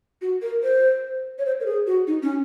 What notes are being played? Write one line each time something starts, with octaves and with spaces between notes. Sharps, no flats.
F#4
A#4
C5
C#5
C5
A#4
G#4
F#4
D#4
C#4